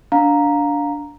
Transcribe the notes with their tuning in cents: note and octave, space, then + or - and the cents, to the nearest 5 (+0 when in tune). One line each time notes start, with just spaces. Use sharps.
D4 -15 F5 +20 A#5 +0